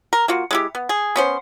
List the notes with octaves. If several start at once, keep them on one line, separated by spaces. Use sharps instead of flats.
A#4
A#3 F4 F#4
G#3 E4 G4
B3
G#4
B3 C#4 C5